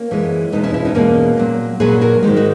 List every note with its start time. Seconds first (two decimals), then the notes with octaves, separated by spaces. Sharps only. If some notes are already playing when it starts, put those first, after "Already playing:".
Already playing: A#3 C#4
0.11 F#2 E3 G#3
0.52 E2 B2 G#3 B3 D#4
0.64 C#4 E4
0.74 C#4 E4
0.85 B3 D#4
0.95 E2 B2 G#3 A#3 C#4
1.38 A#2 F#3
1.80 A#2 F#3 G#4 B4
2.01 F#4 A#4
2.23 G#2 D#3 G#3
2.36 D#4 F#4